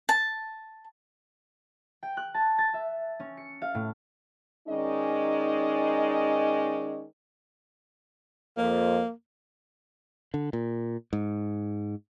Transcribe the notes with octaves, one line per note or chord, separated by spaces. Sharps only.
A5
G5
F#6
A5
A6
E5
C#4
C#7
F5
A2
D#3 G#3 C#4 D#4 D5 D#5
F2 A#3
D3
A#2
G#2